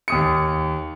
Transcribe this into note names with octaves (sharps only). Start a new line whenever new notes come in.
D#2 D#6 C#7